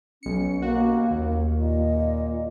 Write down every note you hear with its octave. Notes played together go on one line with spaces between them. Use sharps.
B1 C#4 C#7
A#3 F#4 F5
D#2
A#2 D#5